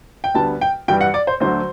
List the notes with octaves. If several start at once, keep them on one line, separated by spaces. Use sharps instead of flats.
G5
D2 D3 G3 B3 A5
G5
G2 E3 G3 G5
F#5
D5
C5
D2 D3 F#3 A3 C5